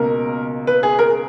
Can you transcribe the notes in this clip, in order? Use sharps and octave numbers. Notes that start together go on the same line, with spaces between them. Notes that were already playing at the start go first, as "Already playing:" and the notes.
Already playing: C#2 B2 A#3 A#4
B4
G#4
A#4